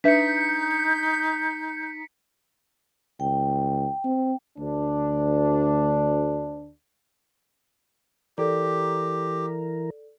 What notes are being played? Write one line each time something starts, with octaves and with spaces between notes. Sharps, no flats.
D4 D#4 B4 E5 G6 B6 C#7
C#2 G5
C4
D2 D4
E3 G4 A4 A#4 D5